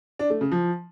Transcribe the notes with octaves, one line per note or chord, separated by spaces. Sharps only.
D4
A3
C#3
F3